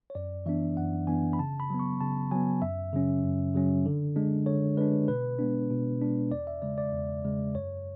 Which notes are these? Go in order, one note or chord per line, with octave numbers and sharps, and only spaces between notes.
C#5
F#2 D5
E3 B3 D4 E5
F#2 F#5
E3 B3 D4 G#5
B5
C#3 A5
B5
F#3 B3
C#6
C#3 A5
F#3 B3 G#5
F#2 E5
C#3 F#3 C#4
F#2
C#3 F#3 C#4
D3
G#3 D4
D3 C#5
G#3 D4 B4
B2 B4
G#3 B3 D4
B2
G#3 B3 D4
E2 D5
E5
C#3 G#3 D5
D5
E2
C#3 G#3
F#2 C#5